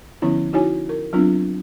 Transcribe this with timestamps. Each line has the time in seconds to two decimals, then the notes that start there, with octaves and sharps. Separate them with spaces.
0.22 D3 F3 B3 C#4 E4
0.53 D#4 E4 F#4 C#5 G#5
0.89 A#4
1.13 F#3 B3 C4 D4 F4